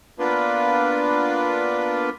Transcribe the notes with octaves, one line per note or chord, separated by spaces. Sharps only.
A#3 B3 D4 F4 B4